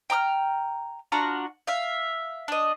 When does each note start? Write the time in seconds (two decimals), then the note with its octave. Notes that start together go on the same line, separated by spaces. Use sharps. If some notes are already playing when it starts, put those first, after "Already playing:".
0.10 G5 A#5 D#6 F6
1.12 D4 F4 F#4 A#5
1.67 E5 F5
2.48 D4 D#5